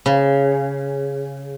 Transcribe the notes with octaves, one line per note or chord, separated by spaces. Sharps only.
C#3